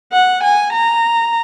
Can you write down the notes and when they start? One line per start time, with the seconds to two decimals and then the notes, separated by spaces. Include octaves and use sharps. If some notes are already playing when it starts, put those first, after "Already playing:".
0.12 F#5
0.43 G#5
0.72 A#5